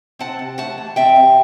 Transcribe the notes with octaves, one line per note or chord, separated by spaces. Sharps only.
C4 F#5 A5
C3
A3 F#5 A5
E3
C4 E5 G5
C3